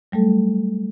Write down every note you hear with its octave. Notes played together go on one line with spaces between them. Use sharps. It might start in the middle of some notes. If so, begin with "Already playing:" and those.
F#3 G3 A3 A4